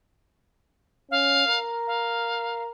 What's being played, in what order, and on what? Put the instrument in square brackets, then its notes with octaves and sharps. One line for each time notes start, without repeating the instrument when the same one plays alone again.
[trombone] C#4 [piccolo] F5
[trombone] A#4
[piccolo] F5